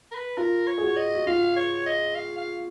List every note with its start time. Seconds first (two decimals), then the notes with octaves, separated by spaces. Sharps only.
0.12 A#4
0.15 B4
0.37 F4 A#4
0.67 C#5
0.78 G#4
0.82 F#4
0.96 D#5
1.15 F#4
1.27 F4 F5
1.56 C#5
1.86 D#5
2.15 F5
2.38 F5